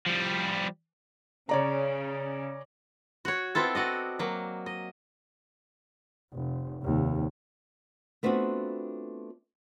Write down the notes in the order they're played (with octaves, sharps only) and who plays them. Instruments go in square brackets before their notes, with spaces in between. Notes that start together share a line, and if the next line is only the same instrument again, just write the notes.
[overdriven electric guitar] F3 G3
[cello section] C#3 [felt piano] C#5 D5 A#5
[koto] F#4 C#5
B3 C4 E4 F4 A4
F#4 D5 D#5
F#3 A#3
D#5
[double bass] F1
F1 D#2
[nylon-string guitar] A3 B3 C4 D4 F4 F#4